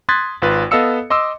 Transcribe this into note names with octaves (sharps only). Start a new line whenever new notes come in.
C6 D#6 F#6 G#6 A6 B6
G#1 F4 B4
B3 A4 D#5 F5 E6 C#7
D#5 C6 D6 E6